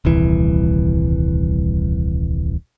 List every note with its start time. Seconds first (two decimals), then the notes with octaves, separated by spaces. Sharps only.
0.05 D#1 C2 E3